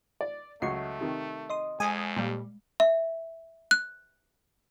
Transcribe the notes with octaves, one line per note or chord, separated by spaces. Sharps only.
D5
C#2 F#3 A3 D#5 C#6 C7
C3 D#3
D#5 C6 D#6
F2 G#3 G#5 D#6
A#2 G3
E5
F#6